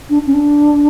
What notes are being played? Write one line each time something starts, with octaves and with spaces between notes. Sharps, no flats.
D4
C#4
D4